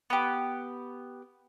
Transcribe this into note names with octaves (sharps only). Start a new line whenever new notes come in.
B3 G4